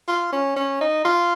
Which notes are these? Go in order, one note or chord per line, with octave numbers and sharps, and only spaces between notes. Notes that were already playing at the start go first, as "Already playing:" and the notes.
F4
C#4
C#4
D#4
F4